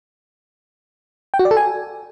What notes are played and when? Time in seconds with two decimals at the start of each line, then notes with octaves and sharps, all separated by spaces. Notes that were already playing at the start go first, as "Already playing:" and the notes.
1.34 G5
1.39 F#4
1.45 D5
1.51 A4
1.57 G#5